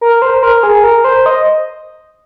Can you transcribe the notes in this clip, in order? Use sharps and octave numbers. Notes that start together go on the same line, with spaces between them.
A#4
C5
A#4
G#4
A#4
C5
D#5